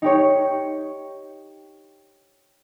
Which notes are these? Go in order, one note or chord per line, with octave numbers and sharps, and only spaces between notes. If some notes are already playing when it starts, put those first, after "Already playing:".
D#4 G4 C#5